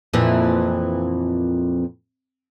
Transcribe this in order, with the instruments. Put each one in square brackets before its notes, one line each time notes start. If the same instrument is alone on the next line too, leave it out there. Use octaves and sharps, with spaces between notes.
[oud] F2 A#2 E3